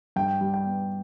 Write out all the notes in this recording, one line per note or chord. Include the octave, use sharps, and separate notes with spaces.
G2 G5
G3
G5
B3